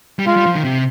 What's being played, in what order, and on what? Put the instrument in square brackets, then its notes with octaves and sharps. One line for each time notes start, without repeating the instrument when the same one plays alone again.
[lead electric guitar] G3
[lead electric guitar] G#3 [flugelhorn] F4
[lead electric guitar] G3
F3
D#3
C3